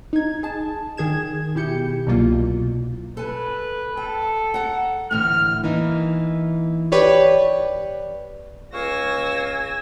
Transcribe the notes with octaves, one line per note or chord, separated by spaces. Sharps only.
D#4 G#6
G#4 A5
D#3 G#4 G#6 E7
B2 E4 G4 G6 C#7
C2 B2 F#3 A#3 F4
A4 B4 G#5
A4 G5
F#5 A#5
A2 D3 E3 F6
E3 A#3 D#4
G4 B4 C#5 D5
C#2 F5 G#5 C#6 E6 A#6